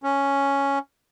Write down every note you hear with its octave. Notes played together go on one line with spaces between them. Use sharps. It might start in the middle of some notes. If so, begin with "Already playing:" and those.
C#4